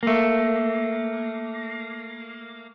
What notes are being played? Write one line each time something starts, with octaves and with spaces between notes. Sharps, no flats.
A3 A#3